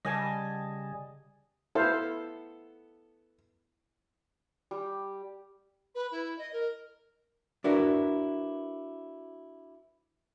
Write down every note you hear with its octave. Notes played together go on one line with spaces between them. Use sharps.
C#3 G3 D#5 G#5 A5
B3 E4 A4 C5 F5
G3
B4
E4
D#5
A#4
D4 E4 F#4 A#4 B4